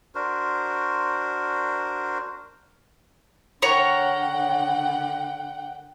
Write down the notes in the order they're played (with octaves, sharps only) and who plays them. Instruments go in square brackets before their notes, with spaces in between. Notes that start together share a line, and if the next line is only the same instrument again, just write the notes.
[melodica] D4 F#4 A#4 C5
[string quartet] D3 F#5 G5 [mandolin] A#4 C#5